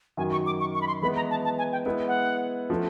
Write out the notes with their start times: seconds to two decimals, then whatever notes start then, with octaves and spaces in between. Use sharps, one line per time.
0.17 F#2 D#3 F#3 G#5
0.32 C#6
0.46 D6
0.60 C#6
0.74 C#6
0.81 B5
0.87 C6
1.02 E3 G#3 B3 B5
1.16 A#5
1.30 A5
1.44 A5
1.58 G#5
1.72 G5
1.86 G#3 B3 E4
2.07 F#5
2.70 F3 A3 C#4